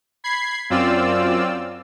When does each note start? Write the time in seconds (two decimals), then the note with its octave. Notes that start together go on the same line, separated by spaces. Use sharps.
0.24 B5 G#6 C7
0.70 F#2 C4 F4 D5 E6